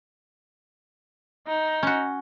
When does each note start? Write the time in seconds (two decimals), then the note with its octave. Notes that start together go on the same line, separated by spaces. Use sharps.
1.47 D#4
1.83 C#4 F#4